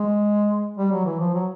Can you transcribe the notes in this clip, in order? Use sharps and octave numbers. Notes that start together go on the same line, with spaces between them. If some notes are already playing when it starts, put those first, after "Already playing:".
Already playing: G#3
G3
F#3
E3
F3
F#3